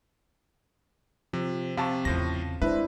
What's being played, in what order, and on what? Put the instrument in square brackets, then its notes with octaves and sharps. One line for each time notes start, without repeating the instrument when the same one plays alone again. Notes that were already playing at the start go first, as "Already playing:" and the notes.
[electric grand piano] C3 [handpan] F3
[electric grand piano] C3 [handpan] C4 [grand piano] F5 A5 C#6
[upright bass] E2 C#3 [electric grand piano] A2 F3 A#6
[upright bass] G#3 [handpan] D4 E4 C5 [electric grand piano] B4 [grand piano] E5